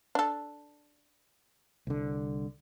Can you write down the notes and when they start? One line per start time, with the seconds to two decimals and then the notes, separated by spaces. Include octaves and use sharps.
0.15 D4 A4
1.87 C2 D3